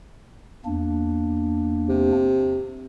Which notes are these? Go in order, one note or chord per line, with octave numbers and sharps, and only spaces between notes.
E2 A#3 D4
C3